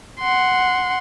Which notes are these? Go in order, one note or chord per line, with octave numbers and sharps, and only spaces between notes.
F#5 C6